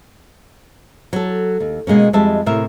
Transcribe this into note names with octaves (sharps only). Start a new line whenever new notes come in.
F#3 A4
D#2
B2 G#3 A#3 C#4
F2 G3 G#3 D#5 E5 A5
A2 C3 A#4 E5